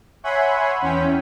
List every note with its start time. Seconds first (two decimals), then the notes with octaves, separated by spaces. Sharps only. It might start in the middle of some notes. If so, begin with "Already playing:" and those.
0.24 C#5 E5 F#5 G#5 B5 C6
0.82 E2 C#4 G5 B6